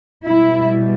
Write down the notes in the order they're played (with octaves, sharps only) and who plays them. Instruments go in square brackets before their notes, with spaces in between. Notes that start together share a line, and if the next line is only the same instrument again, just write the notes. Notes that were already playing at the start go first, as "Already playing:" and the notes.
[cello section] B2 G3 E4